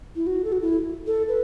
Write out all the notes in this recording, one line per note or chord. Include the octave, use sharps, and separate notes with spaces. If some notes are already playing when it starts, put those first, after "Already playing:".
E4
F#4
A4
F#4
E4
A4
B4